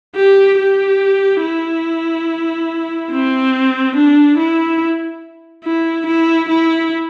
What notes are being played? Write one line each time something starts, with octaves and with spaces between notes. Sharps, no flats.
G4
G4
E4
C4
D4
E4
E4
E4
E4